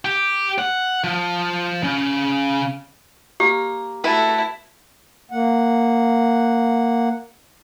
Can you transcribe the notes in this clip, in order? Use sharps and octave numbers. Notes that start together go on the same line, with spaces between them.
G4
F#5
F3
C#3
A#3 G4
A3 E4 F#4 A4 B4
A#3 F#5